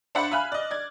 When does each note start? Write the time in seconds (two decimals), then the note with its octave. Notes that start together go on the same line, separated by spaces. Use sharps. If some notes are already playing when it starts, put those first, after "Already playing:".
0.15 D4 C5 D5 E5 F#5 B5
0.31 E5 F5 G#5 B5 F6 F#6
0.52 D5 D#5
0.71 D5 G#6